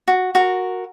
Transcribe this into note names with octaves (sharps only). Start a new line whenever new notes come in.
F#4
F#4 A#4